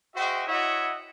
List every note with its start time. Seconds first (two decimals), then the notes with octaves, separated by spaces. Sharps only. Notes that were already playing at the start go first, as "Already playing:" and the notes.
0.15 F#4 G#4 C5 D#5 E5 G5
0.47 E4 F#4 C#5 D#5 E5 F#5